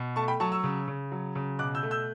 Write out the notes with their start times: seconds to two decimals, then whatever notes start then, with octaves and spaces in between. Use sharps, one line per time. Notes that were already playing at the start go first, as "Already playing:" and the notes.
Already playing: B2
0.16 A3 A5 C#6
0.28 G5 B5
0.40 F#3 A5 C#6
0.52 C#6 E6
0.64 C#3
0.88 C#3
1.12 F#3
1.35 C#3
1.59 B2 D6 F#6
1.75 E6 G6
1.83 A3
1.91 E6 G6